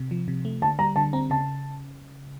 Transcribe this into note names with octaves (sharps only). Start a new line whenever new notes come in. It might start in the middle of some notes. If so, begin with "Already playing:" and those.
Already playing: C3
F3
C3
A3
D3 A5
G3 A#5
D3 A5
C4 A#5
C#3 A5